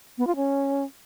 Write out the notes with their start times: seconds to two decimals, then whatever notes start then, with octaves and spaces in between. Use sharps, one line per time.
0.18 B3
0.27 F4
0.36 C#4